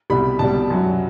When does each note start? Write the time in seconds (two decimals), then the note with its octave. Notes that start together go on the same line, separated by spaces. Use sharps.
0.10 C2 B2 G3 B5
0.39 C2 B2 G3 A5
0.70 F#2 F#3